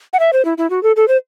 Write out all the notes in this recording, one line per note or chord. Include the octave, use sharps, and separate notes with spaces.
F#5
E5
C5
E4
E4
F#4
A4
A4
C5